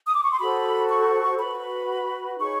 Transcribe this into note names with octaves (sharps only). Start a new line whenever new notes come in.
D#6
D6
C#6
C6
F#4 A4 C5 B5
C#6
F#4 B4 B5
D#4 G#4 C#5 C#6